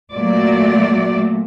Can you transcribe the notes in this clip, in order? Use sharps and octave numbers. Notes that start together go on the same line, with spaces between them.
A#2 F#3 A3 D5